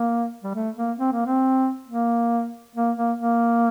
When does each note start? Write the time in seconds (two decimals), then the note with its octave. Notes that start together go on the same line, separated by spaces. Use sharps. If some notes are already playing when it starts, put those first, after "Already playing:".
Already playing: A#3
0.44 G3
0.55 A3
0.77 A#3
0.99 C4
1.13 A#3
1.26 C4
1.87 A#3
2.76 A#3
2.97 A#3
3.19 A#3